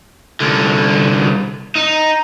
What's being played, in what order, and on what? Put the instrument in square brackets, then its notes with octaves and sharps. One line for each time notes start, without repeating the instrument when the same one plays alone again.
[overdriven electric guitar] C2 D3
D#4